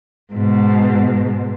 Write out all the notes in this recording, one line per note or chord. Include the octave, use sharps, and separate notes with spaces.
G#2 B2